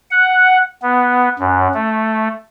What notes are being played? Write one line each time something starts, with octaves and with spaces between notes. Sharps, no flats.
F#5
B3
F#2
A3